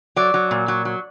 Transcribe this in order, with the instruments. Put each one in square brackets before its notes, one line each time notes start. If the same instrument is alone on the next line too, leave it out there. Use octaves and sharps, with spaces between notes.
[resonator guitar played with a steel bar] F#3 D5
F#3
A#2
F#3
F#3